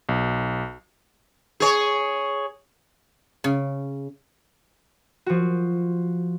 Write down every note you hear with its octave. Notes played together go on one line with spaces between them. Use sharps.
B1
G#4 C#5
C#3
F3 F#4